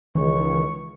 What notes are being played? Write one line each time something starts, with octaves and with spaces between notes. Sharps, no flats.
C#2 D#3 E3 C#6